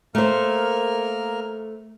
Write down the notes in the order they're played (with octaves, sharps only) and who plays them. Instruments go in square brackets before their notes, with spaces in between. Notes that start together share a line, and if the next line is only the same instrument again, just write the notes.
[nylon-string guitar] A3 C5 [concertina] A#3 A#4 F6